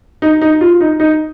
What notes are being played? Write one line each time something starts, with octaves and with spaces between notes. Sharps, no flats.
D#4
D#4
F4
D#4
D#4